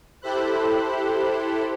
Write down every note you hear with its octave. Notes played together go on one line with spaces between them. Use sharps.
E4 G4 A4 C5 B5 F#6